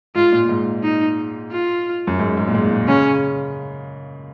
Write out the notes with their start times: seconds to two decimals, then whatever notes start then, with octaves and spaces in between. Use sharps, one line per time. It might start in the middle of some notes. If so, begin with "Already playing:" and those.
0.15 G#2 F4
0.32 A#2
0.49 G#2
0.83 D#4
1.51 F4
2.07 F#2
2.19 G#2
2.37 G#2
2.48 A#2
2.54 G#2
2.71 A#2
2.88 C#3 C#4